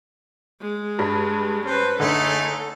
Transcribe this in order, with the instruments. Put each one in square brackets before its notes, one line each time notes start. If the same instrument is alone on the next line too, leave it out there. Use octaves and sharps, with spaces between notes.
[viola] G#3
[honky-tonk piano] G2 G3
[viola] C#4 B4 [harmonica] C5
[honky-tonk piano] F#1 D3 [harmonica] A3 D#4 G#4 [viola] A4